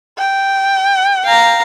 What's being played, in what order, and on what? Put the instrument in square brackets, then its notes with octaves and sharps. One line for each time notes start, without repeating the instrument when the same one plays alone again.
[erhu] G5
[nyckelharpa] F5 A#5